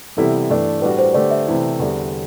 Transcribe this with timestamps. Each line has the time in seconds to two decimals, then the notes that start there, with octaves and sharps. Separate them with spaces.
0.17 C3 E3 G3 B3 E4 A4
0.50 G2 E3 A3 D4
0.82 A2 G3 D4 F#4 B4
0.99 C5
1.14 D3 A3 D4 G4 D5
1.31 E5
1.47 C3 E3 A3 E4
1.79 E2 D3 G3